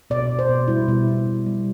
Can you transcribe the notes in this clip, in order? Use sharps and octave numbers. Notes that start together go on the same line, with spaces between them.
B2 D5
B2
C5
B2
G3 E4
B2
B2
B2
G3